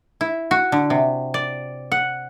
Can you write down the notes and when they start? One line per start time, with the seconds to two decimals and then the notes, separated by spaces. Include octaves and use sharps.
0.21 E4
0.51 F#4
0.72 D3
0.90 C3
1.34 D5
1.92 F#5